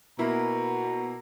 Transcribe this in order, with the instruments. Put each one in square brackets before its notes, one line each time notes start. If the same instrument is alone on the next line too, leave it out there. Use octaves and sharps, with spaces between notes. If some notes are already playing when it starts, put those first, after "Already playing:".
[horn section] B2 A#5 [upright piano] A#3 E4